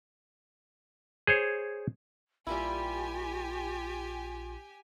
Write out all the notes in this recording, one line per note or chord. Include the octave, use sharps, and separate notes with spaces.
G#4 C5 C#5
A#1 G3 A#3 E4 F4 G4 G#5